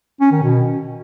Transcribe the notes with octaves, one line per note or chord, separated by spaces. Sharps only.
C#4
D#3
B2